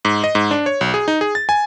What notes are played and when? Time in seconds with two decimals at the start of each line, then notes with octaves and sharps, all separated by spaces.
0.05 G#2
0.24 D#5
0.35 G#2
0.51 D4
0.66 C#5
0.81 B1
0.94 G#4
1.08 D#4
1.21 G#4
1.35 A6
1.49 G#5